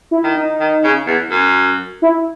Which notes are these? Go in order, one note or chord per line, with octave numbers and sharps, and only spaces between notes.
E4
D#3
D#4
D#3
C#3
E2
F#2
E4